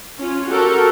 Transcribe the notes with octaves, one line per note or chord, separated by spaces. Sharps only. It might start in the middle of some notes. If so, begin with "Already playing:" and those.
C#4 F4
F#4 G4 A4 A#4